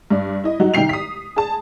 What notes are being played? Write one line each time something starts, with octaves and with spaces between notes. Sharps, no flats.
G2 D5
E4 D#5
F#3 G3 D#4 F#4
C2 D#3 G5 C7 F7
D#6 B6
G#4 A5